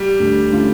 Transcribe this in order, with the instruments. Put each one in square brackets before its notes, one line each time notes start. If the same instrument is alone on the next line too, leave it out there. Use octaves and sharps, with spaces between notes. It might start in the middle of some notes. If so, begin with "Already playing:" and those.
Already playing: [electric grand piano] G3
[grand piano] D2
D3 A3 C#4 F4